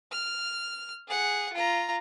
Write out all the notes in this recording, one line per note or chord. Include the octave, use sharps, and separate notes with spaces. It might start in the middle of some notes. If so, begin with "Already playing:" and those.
F6
G#4 F#5
F4 A#5